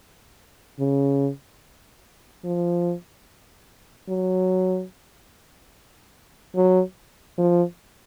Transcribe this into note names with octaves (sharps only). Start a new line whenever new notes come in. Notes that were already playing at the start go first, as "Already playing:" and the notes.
C#3
F3
F#3
F#3
F3